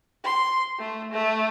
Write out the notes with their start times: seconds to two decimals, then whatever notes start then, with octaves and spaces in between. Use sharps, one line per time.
0.24 C6
0.79 A3
1.12 A3